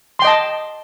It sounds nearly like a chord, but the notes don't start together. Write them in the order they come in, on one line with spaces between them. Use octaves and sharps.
C6 G5 D#5 A5